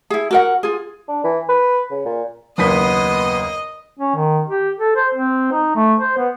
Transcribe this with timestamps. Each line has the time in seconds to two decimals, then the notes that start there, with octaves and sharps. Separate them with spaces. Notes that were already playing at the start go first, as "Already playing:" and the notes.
0.10 E4 G#4
0.31 F#4 A#4 F#5
0.63 F4 G#4
1.08 D4
1.24 E3
1.49 B4
1.91 C#3
2.05 A#2
2.58 F#1 D#2 B3 D#5 C6 D#6 B6
3.99 C#4
4.16 D#3
4.47 G4
4.79 A4
4.96 C5
5.15 C4
5.52 D#4
5.76 A3
6.00 C5
6.18 B3